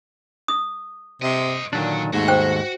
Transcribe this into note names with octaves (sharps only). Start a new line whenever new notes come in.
D#6
C3 C5 D#5
A#2 D3 D#3 F#3 D4
D#2 G#2 A3 F#4
C5 G5